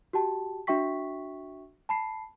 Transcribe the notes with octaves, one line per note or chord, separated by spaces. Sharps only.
F#4 G4 G5 A5
D4 F#4 E5 G5 C#6 B6
A5 B5 C7